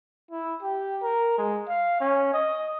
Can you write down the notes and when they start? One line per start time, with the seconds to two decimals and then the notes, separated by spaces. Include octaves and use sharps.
0.31 E4
0.62 G4
1.02 A#4
1.38 G#3
1.68 F5
2.01 C#4
2.34 D#5